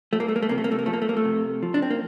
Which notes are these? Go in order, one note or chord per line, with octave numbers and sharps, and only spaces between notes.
F3 A3
A#3
A3
A#3
A3
C3 A#3
A3
A#3
A3
A#3
F3 A3
A#3
A3
A#3
A3
C3
F3
D4
C4
A#3